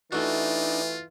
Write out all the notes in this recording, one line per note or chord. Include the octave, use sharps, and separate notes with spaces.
E3 A3 D4 D#4 F4 F#4